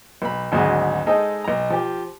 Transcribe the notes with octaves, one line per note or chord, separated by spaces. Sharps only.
B1 B5
G#1 D2 F#3 G#4 D#5
G#3 D#4 G#4 A4 C5 D#5
B1 A#5
F3 G4